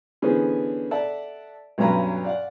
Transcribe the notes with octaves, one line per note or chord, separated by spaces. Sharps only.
D3 E3 B3 C#4 G#4 C5
A4 D5 E5 F#5 A5
B1 G2 F#3 C#4 A#5 B5
D5 F5 F#5